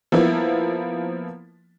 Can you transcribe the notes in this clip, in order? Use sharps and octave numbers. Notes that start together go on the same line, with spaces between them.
F3 A#3 B3 E4